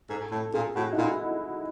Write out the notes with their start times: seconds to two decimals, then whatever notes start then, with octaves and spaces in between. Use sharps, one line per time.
0.09 G#2 A4
0.32 A2 A4
0.54 A#2 G#4
0.75 A2 F#4
0.92 D#4
0.98 A#2 E4